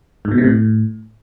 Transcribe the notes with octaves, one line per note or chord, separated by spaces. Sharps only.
G#2
B2
C3
A2